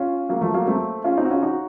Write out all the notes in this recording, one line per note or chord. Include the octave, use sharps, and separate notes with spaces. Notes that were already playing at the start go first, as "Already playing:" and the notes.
Already playing: C#4 F4
F#3 A#3
F3 A3
F#3 A#3
A3 C4
C#4 F4
C4 D#4
F#4
C#4 F4
D#4 F#4